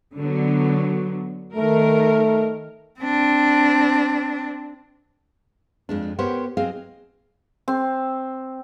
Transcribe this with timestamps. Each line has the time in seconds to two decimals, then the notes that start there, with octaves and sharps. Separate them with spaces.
0.16 D3 F#3 B3
1.56 D#3 A3 A#4
3.01 C4 D4
5.89 F2 G#3 D4
6.19 B3 G4 A#4 C5 C#5 F#5
6.57 F#3 C4 G#4 D#5 F5
7.68 C4